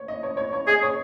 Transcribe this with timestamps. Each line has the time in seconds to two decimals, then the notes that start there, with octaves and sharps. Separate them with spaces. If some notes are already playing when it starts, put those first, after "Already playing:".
Already playing: C#5
0.08 D#5
0.23 C#5
0.37 C#5
0.53 C#5
0.67 G#4 D#5
0.83 C#5